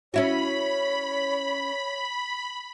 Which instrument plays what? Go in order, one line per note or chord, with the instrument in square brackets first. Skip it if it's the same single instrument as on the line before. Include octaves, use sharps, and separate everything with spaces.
[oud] C#4 E4 F#4 [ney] C#5 [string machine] B5